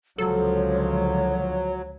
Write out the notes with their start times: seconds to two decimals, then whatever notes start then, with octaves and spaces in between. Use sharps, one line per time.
0.18 C#2 D3 F3 F#3 A4 C#5